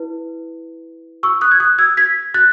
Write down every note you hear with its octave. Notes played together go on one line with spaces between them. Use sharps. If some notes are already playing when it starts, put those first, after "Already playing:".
Already playing: E4 B4
C#6 E6
D#6 F#6
G#6
D#6 F#6
E6 G#6
G#6 B6
F#6 A6